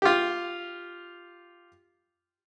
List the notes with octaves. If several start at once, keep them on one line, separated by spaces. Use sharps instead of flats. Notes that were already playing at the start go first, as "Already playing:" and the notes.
F4 G4